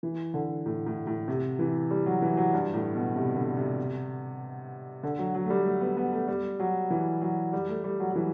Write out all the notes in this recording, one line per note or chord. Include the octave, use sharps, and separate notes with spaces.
E3
D3
A2
A2
A2
C3
E3
G3
F#3
E3
F#3
G2
A2
B2
C3
D3
C3
D3
F#3
F#3
A3
G3
A3
B3
B3
A3
G3
F#3
E3
F#3
G3
A3
G3
F#3
F#3
E3